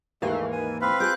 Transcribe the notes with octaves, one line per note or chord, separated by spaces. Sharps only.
D#2 G#2 E3 A3 A#4 F5
G#5
C4 B4 F5 B5
F4 G#4 G5 D6 F#6